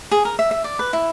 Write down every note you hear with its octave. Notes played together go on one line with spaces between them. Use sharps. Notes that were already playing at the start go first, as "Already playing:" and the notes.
G#4
A#4
E5
E5
D5
B4
E4